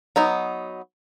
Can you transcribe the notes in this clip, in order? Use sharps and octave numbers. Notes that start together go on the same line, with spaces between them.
F#3 B3 D#4